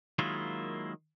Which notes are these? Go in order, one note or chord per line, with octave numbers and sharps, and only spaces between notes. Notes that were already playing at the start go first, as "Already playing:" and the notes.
D#3 F#3 G#3 A#3 E4 F4